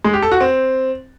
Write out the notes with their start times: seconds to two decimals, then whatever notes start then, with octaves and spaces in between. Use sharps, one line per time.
0.04 G#3
0.13 G4
0.23 A4
0.32 F#4
0.41 C4